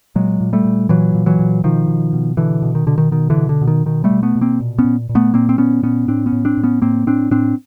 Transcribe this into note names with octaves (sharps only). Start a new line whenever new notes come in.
A#2 F#3 G#3
A#2
G3 A3
A#2
A#2 E3 F#3
A#2
E3 F#3
A#2
B2 D#3 F3
B2
B2
B2 D3 E3
B2
D#3
B2 D3
D#3
B2 D#3
D3 E3
B2
D3
B2
D#3
B2 D#3
G3 A3
B2
A3 B3
B2
A#3 C4
A#2
B3 C#4
A#2
A#2
A3 B3
A#2 A#3 C4
C4
A#2 B3 C#4
A#2 B3 C#4
A2 C4 D4
B3 C#4
A2
C4 D4
A2
B3 C#4
A2 A#3 C4
A2 C4 D4
A2 C4 D4